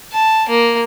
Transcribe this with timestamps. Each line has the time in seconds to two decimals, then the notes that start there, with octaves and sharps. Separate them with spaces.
0.13 A5
0.49 A#3